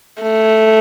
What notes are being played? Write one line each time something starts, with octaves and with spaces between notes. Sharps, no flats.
A3